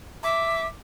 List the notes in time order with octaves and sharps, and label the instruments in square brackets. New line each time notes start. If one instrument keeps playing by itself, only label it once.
[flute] E5 [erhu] D6